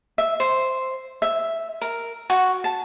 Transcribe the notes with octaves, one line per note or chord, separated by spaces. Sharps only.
E5
C5
E5
A#4
F#4
A5